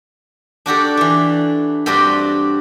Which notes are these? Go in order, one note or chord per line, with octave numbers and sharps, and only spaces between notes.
D4 F#4 G4 A4
E3 D4
G2 C4 D4 F#4 G4 C6